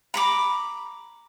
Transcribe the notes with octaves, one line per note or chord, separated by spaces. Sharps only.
A#5 B5 D6